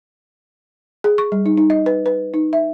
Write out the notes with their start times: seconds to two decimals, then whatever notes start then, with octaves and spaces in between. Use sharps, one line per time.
1.04 G#4
1.18 C#6
1.32 G3
1.46 D#4
1.58 D#4
1.70 D#5
1.86 B4
2.06 B4
2.34 D#4
2.53 E5